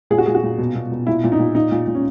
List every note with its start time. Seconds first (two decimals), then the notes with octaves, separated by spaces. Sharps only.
0.10 A#2 G#4
0.18 F#4
0.26 A#2 G#4
0.35 F#4
0.43 A#2
0.58 B2
0.75 B2
0.91 B2
1.07 A#2 E4
1.24 A#2
1.32 D#4
1.39 A#2
1.55 A#2 D#4
1.71 A#2
1.87 A#2
1.95 C#4